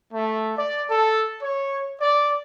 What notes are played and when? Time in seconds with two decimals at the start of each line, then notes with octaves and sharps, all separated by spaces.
0.12 A3
0.58 D5
0.89 A4
1.43 C#5
2.01 D5